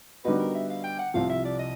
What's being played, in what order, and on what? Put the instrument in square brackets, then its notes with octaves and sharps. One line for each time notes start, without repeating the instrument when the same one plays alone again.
[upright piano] D3 G3 B3 D#4 F#4 [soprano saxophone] B4
[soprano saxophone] A#4
E5
F5
G5
F#5
[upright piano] C2 C3 F3 [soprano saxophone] F5
[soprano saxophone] E5
D5
D#5